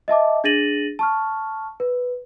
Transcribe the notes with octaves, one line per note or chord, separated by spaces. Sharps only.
D#5 E5 A5 D6
D4 G#4 A6 A#6 D#7 F#7
A5 C#6 F6
B4